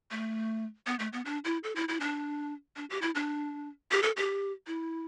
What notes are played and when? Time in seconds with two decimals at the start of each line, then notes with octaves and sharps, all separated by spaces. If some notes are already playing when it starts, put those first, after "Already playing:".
0.11 A3
0.86 B3
0.99 A3
1.13 B3
1.25 D4
1.45 E4
1.64 A4
1.76 E4
1.88 E4
2.00 D4
2.76 D4
2.90 G4
3.02 E4
3.15 D4
3.91 G4
4.03 A4
4.17 G4
4.67 E4